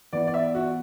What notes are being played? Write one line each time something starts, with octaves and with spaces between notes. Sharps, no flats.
E3 B3 E4 D5
D5
E5
F#4